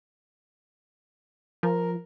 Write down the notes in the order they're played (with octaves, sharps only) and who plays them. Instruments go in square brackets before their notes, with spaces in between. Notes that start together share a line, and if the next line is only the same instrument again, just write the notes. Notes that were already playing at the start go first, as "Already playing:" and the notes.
[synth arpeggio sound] F3 [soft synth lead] A#4